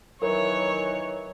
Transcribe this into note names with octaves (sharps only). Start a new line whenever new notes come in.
D#3 E3 F#3 A#4 C#5